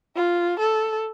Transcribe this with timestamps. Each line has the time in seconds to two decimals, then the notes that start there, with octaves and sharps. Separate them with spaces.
0.16 F4
0.60 A4